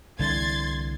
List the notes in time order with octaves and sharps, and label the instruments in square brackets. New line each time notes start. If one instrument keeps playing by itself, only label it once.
[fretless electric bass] C2 D3 E3 [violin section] C6 G#6 A6